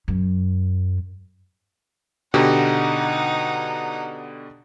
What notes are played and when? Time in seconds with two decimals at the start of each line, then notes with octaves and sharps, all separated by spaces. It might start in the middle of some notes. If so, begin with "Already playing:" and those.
0.08 F#2
2.34 B2 D3 D#4 G4 F#5